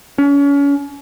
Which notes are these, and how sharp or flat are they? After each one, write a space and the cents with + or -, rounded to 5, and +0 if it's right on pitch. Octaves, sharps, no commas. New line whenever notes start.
C#4 +35